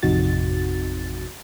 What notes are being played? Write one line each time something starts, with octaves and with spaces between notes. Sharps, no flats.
A1 F2 C3 D#4 F#4 A6